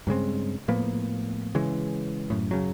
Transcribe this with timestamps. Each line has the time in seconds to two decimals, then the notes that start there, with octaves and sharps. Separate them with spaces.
0.07 G2 C#3 G#3 C4
0.68 A2 F3 A#3 B3
1.55 C#3 E3 G#3
2.30 F#2 A2
2.51 F#2 C#3 F#3